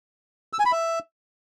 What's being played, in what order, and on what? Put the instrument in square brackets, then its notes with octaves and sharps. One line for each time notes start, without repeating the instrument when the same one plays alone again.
[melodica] E6
G#5
B5
E5